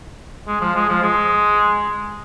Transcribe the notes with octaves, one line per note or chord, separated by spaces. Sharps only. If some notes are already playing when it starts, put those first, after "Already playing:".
G#3
F3
G#3
F3
G#3